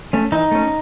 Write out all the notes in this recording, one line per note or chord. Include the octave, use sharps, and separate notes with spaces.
A3 C#4
E3 D#4
A3 C#4